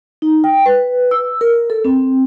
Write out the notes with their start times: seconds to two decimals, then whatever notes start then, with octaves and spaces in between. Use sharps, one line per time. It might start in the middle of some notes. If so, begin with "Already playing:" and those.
0.22 D#4
0.44 G5
0.66 B4
1.11 E6
1.41 A#4
1.70 A4
1.85 C4